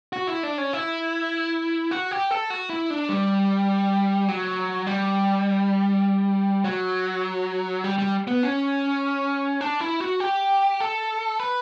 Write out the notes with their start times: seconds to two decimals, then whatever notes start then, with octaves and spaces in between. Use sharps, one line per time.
0.13 F#4
0.28 E4
0.43 D4
0.58 C#4
0.73 E4
1.91 F#4
2.11 G4
2.31 A4
2.50 F#4
2.69 E4
2.90 D4
3.09 G3
4.28 F#3
4.87 G3
6.64 F#3
7.84 G3
7.98 G3
8.27 B3
8.43 C#4
9.61 D4
9.80 E4
10.00 F#4
10.20 G4
10.80 A4
11.40 B4